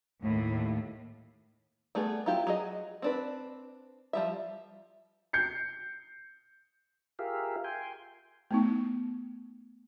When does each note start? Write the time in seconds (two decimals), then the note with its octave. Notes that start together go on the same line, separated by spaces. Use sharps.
0.22 D#2 A2
1.95 G3 A3 B3 G#4
2.26 F#3 E4 F4 G4
2.47 F#3 G#4 D#5
3.02 C4 D4 B4
4.13 F3 G3 E5
5.33 G6 C7 C#7
7.19 F4 G4 G#4 A#4 E5 F5
7.64 G5 G#5 C6
8.51 A3 B3 D#4